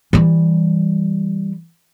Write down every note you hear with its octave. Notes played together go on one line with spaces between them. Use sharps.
E3 G3